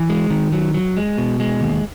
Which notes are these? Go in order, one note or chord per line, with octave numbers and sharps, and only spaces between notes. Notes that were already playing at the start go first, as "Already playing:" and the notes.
Already playing: E3
G#3
D#3
F#3
F#3
G#3
B2
G#3
D#2